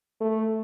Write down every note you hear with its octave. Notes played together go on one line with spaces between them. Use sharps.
A3